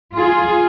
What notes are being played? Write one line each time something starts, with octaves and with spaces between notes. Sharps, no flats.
F4 G#4